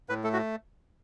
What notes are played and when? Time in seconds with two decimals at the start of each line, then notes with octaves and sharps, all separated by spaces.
0.09 A2 B4
0.24 A3 A4
0.33 F#4